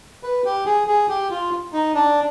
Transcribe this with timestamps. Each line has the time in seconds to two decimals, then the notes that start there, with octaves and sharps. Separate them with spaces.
0.23 B4
0.45 G4
0.66 G#4
0.87 G#4
1.09 G4
1.31 F4
1.73 D#4
1.95 D4